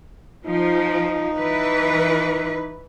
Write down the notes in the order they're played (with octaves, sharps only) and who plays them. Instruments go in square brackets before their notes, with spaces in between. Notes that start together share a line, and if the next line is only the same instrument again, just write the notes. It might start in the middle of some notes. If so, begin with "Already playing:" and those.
[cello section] F3 [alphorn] D#4
[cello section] E3 B4